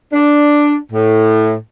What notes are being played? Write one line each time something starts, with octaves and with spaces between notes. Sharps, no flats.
D4
A2